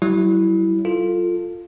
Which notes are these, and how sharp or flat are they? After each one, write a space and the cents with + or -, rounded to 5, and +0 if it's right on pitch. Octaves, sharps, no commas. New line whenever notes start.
F#3 +45 E4 +0
F4 +0 A4 +10